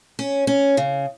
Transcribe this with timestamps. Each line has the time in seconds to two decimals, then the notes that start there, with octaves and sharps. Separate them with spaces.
0.19 C#4
0.47 C#4
0.77 C#3